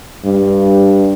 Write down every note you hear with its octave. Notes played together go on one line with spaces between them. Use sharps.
G2